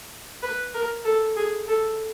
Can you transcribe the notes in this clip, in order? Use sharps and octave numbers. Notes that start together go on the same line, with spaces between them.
B4
A#4
A4
G#4
A4